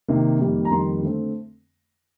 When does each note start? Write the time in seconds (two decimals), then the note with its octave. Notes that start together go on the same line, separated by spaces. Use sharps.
0.08 C3 D#3 A#3
0.40 F2 D#3 G3 A#3
0.65 A#5
0.71 F2 D#3 G3 A#3 C6
1.02 D3 A3 C4